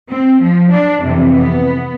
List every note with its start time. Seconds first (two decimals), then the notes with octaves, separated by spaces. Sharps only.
0.12 C4
0.42 F3
0.72 D4
1.01 F2 C3 E3
1.31 B3